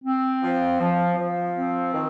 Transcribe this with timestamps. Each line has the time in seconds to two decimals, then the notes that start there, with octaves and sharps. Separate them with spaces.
0.04 C4
0.43 F3
0.80 F3
1.17 F3
1.56 C4
1.93 D#3